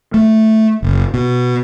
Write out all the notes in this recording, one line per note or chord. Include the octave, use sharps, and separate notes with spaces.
A3
F#1
B2